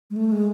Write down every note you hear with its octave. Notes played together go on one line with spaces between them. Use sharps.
G#3
A3
G#3